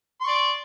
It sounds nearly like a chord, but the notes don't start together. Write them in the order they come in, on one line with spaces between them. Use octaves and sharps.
C6 C#6 D5